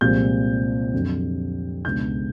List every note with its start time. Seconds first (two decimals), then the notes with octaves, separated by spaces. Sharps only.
0.01 C2 A#2 F3 G#3 C4 G6
0.94 F2 D3 F#3
1.85 C#2 B2 G#3 B3 D4 G6